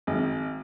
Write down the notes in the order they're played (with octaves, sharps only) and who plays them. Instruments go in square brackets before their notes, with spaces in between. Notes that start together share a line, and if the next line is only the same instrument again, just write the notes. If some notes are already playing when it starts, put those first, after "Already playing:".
[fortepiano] G#1